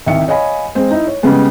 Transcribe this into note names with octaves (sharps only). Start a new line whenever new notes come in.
C2 D#3 E5 C#7
C#5 D#5 F5 G#5 B5
G#3 C4
D#4 E4
C#5
C#3 G3 G#3 B3 C#4